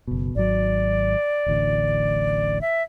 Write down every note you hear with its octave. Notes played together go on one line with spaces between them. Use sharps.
F#1 B2
G#1 F#3 D5
D1 A1 D2
E5